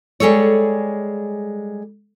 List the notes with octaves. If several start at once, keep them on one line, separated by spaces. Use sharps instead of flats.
G3 G#3 G#4 A4 C#5